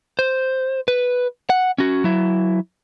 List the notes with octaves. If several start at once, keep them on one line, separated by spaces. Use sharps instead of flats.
C5
B4
F#5
C#4 F#4
F#3 E4